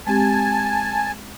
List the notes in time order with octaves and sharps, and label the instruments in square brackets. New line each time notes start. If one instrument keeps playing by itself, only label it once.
[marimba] G#3 C4 G4 [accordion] G#5 A5